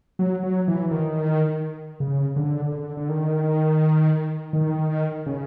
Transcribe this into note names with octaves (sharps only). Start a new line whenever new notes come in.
F#3
F#3
E3
D#3
C#3
D3
D3
D3
D#3
D#3
C#3